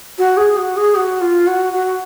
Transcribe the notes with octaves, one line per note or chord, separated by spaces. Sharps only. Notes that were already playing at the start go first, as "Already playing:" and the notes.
F#4
G#4
F#4
G#4
F#4
F4
F#4
F#4